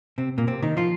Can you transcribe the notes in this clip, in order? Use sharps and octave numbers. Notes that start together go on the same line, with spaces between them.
C3 C4
A#2 A#3
C3 C4
D#3 D#4
F3 F4